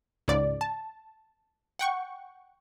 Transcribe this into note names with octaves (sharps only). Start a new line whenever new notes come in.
C#2 G#2 D5
A5
F#5 G5 C#6